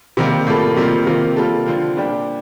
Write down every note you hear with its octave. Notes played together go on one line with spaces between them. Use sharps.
C3 D#3 G3 A#3
A2 G3 A#3 F4 A4
C3 D#3 G3 A#3 F4
C3 D#3 A#3 F4
G3 A#3 F4 A4
D3 F3 C4 F4
A#2 G3 D4 G4